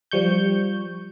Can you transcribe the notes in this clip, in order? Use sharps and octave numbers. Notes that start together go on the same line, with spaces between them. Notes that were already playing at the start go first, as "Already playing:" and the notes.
F3 G3 C#6 G6